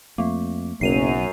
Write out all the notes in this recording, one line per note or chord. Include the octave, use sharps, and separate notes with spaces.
F2 A3 A#3
F#1 B1 F#2 C7 D#7 F7